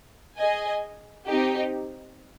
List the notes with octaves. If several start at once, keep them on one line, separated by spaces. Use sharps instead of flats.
G#4 D#5 G#5
C4 D#4 G4